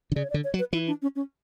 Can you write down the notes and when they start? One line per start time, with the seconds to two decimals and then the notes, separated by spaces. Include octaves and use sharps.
0.12 D3
0.16 C#3 D5
0.24 C#5
0.30 D5
0.34 D3
0.44 C#5
0.54 F#3
0.59 B4
0.73 E3 E4
0.87 D4
1.02 C#4
1.16 C#4